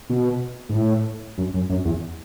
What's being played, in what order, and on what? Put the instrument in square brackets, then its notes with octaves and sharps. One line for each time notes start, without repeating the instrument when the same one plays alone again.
[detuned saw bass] B2
G#2
A2
F#2
F#2
F#2
E2